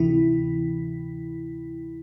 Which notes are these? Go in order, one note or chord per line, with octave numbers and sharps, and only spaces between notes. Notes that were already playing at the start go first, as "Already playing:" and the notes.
Already playing: D2 C3 E3 E4